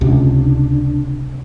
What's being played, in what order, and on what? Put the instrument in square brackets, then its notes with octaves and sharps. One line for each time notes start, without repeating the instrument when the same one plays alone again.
[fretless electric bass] C#2 [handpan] C3 [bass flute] D4